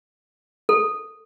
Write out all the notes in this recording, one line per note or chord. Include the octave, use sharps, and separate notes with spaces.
A4